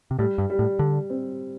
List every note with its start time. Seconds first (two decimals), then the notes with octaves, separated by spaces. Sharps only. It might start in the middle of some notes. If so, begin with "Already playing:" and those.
0.11 C3
0.18 A2 G3
0.38 G2
0.50 G3
0.59 A2
0.79 D3 G3
1.10 C4